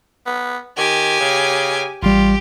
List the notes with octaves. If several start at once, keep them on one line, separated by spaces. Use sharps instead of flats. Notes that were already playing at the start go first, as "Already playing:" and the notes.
B3
D#3 G4 G#5
C#3
A1 G3 F4 G4